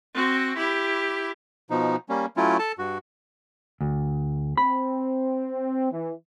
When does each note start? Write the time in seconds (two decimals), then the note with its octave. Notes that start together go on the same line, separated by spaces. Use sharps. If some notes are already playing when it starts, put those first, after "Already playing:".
0.14 C4 F#4
0.57 E4 G4
1.70 B2 F3 D#4
2.09 G3 A#3 C#4
2.37 F#3 A3 C#4 E4 F4
2.59 A4 A5
2.79 G2 F#4
3.81 D2
4.57 C4 B5
5.93 E3